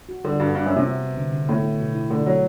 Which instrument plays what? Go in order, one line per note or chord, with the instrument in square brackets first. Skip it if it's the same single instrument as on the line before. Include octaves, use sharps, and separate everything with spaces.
[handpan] F#4
[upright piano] D3 [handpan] G3
[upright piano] G2 [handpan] F#4
[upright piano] G2 [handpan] B3
[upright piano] F#2 [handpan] B3
[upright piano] C3
[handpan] B3
B3
D3
D3
[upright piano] A2 [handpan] D3
[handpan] B3
B2
E4
[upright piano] D3 [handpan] A3
[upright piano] F#3 [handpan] A3